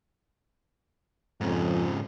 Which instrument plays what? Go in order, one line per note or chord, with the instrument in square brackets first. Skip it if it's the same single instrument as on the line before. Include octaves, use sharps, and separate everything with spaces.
[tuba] F2 [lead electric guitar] G#2 C#3